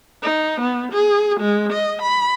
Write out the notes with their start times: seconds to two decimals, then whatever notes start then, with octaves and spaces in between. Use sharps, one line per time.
0.23 D#4
0.61 B3
0.92 G#4
1.40 G#3
1.73 D#5
2.02 B5